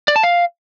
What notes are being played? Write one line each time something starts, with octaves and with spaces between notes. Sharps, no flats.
D5
A5
F5